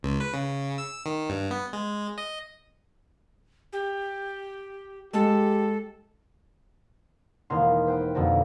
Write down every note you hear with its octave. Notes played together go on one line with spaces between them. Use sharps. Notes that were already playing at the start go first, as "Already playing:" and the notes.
C#2
B4
C#3
E6
D#3
G2
B3
G#3
D#5
G4
G#3 G4 A4
E1 D#3 A#3 B3 F5 C6
B4 C5 G5
F2 B2 D3 F3 A#3